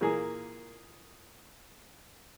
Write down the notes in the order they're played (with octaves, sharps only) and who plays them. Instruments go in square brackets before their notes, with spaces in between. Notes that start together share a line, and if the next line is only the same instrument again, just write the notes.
[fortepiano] A#2 E3 A#3 G#4